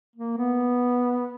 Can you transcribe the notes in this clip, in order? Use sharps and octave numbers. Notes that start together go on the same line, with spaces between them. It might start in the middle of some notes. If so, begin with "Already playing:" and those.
A#3
B3